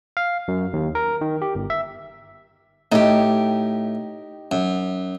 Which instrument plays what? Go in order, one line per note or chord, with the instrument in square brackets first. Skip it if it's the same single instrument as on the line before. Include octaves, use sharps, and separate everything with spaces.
[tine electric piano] F5
F#2
D#2
A#4
D#3
G4
G1
E5
[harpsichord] A2 [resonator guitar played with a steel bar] D#4 G4
[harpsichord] F#2